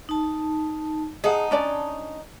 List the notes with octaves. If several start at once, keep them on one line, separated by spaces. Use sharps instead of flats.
D#4 A5
D#4 G#4 F#5 A5
C#4 D4 D5